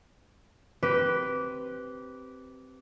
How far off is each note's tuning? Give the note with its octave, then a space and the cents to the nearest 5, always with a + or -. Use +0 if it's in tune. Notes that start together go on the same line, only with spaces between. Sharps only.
C4 +0 G4 -20 B4 +0